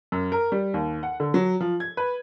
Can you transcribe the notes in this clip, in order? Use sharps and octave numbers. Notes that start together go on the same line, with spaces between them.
F#2
A#4
G3
D#2
F#5
D3
F#3
F3
G#6
B4